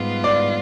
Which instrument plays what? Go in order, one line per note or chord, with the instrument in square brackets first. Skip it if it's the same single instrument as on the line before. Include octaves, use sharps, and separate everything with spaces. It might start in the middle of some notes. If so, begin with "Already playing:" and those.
Already playing: [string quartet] G#2 G3 B3 F4 B4
[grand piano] D5